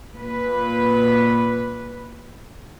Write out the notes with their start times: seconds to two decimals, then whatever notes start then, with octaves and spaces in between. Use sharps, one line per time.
0.16 A#2 B4